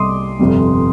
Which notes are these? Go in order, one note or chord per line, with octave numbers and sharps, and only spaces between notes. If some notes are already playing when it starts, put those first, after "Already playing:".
Already playing: C2 C3 G3 D#5 C6 D6 D#6
G1 F2 C3 G3